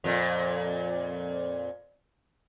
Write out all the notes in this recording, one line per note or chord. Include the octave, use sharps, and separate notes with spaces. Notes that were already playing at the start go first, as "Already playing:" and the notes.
F2 A#2